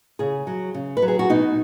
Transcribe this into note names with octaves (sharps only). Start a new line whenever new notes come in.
C#3 G#4
F#3
C#3
B4
F#3
G#4
F#4
B2 D#4